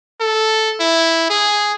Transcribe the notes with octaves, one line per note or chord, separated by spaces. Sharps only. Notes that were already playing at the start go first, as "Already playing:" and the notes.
A4
E4
G#4